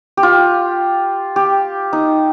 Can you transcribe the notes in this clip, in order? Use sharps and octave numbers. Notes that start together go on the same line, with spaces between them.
G4
F4
G4
D#4